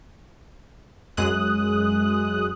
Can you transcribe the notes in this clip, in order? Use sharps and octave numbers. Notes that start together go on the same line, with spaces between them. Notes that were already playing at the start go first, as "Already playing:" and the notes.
F#2 G#3 D#6 F#6